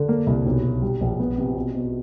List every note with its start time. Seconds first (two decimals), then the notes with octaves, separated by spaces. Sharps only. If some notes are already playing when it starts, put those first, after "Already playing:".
Already playing: D3
0.08 A#3
0.27 C2
0.46 B1
0.64 B1
0.82 G3
1.01 A#1
1.19 B3
1.38 C3
1.55 B2
1.75 B2